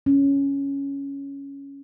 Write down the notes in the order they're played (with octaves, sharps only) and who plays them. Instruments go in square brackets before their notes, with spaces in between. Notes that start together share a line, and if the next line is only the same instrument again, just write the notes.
[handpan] C#4